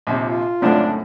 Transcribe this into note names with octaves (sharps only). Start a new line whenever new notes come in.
A#1 D#2 C3
F4
C#2 F#2 A2 A3 C4 D4